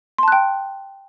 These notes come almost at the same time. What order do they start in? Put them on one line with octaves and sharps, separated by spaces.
C6 A5 F#6 G5